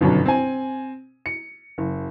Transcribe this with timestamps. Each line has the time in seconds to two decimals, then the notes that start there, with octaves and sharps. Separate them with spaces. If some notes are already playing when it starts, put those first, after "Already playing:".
0.01 G1 F#2 B2 D#3
0.26 C4 G#5
1.26 C#7
1.78 F#1